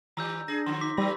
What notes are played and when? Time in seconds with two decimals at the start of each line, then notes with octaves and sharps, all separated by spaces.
0.17 D#3 G3 A#5 E6 G6
0.48 D4 G#4 A#6
0.66 D3 F3 C6
0.81 D#4 D6 B6
0.97 E3 G3 A3 B5 E6 A#6